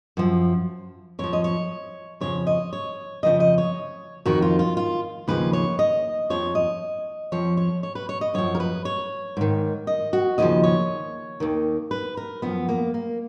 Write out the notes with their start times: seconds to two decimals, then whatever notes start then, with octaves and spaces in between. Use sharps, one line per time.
0.17 F#2 F3
1.19 F2 F3 C#5
1.33 D#5
1.44 C#5
2.21 F2 C#3 F3 C#5
2.47 D#5
2.73 C#5
3.23 F2 C#3 F3 D#5
3.40 D#5
3.58 C#5
4.25 F2 D#3 F#4
4.42 F4
4.59 F4
4.77 F4
5.28 D#2 C#3 F3 B4
5.53 C#5
5.79 D#5
6.30 F2 F3 C#5
6.55 D#5
7.32 F2 F3 C#5
7.57 C#5
7.83 C#5
7.95 B4
8.09 C#5
8.21 D#5
8.34 F#2 F3 C#5
8.55 A#4
8.60 B4
8.85 C#5
9.37 G#2 D#3
9.87 D#5
10.13 F#4
10.38 D#2 C#3 F3 D#5
10.64 C#5
11.40 D#2 D#3
11.91 B4
12.17 A#4
12.42 F#2 F3 B3
12.69 A#3
12.94 A#3